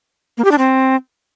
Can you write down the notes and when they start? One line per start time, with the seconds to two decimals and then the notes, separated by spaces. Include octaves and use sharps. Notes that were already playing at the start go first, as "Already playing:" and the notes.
0.38 A#3
0.45 G4
0.51 D4
0.58 C4